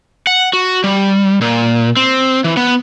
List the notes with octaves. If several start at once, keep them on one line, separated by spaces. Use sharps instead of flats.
F#5
F#4
G3
A#2
C4
E3
B3